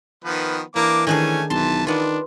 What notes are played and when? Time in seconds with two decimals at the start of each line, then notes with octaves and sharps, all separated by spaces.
0.24 D#3 F3 B3 B4
0.76 E3 A#3 D4 E4 D6
1.07 D#3 A3 C#4 D4 G#4 G#5
1.50 B1 E3 A5 C6
1.87 D#3 B3 D4 F4